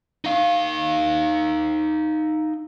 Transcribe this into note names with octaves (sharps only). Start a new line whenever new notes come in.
D#4 F5